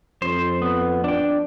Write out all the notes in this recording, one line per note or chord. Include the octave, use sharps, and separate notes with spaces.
F2 C5
B3
D4 G5